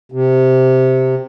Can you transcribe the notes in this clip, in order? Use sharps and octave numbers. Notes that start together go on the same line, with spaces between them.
C3